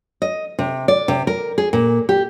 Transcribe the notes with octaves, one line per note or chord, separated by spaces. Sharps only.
D#5
C3
D5
C3
A#4
G#4
A#2
G4